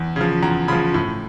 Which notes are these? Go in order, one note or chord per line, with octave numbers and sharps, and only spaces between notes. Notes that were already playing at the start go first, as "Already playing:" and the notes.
Already playing: E2
C#3 F3
E2 A#5
C#3 F3 B5
A2